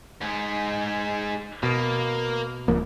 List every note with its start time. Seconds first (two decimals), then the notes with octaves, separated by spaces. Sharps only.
0.21 G#2 G#3
1.63 B2 A#3
2.68 D1 F3 A#3